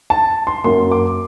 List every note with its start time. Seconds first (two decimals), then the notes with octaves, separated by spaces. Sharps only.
0.10 A5
0.47 C6
0.64 F#2 F#3 A#3 C6
0.92 D6